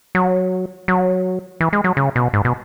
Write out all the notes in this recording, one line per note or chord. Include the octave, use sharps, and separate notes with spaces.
F#3
F#3
E3
G#3
F#3
C#3
B2
G#2
B2